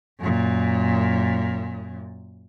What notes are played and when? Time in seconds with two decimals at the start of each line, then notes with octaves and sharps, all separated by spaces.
0.19 F#2 A#2